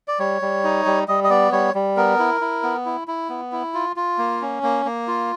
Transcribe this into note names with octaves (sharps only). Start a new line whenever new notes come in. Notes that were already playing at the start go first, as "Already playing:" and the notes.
D5
G3 C#5
G3
D#4
G3
G3 D#5
D#5
B3 D5
G3 C#5
G3
B3 A#4
E4
E4
B3
E4
E4
B3
E4
F4
F4
A#3
C#4
A#3
A#3
F4